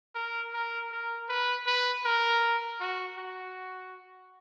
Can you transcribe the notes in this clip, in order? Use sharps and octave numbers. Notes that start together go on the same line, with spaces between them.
A#4
A#4
A#4
B4
B4
A#4
F#4
F#4